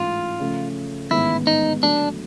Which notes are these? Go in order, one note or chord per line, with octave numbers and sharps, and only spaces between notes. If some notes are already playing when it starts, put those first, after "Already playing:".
Already playing: A1 G#2 E3 A3 C#4 F4
C#3 F3 A3
A1 G#2 D#3 G#3 B3 E4
D#4
D3 F#3 A3 D4